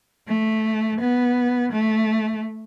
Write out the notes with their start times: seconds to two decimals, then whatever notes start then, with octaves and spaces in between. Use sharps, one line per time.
0.28 A3
1.01 B3
1.72 A3